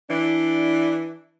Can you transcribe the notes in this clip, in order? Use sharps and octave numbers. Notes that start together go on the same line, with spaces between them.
E3 D4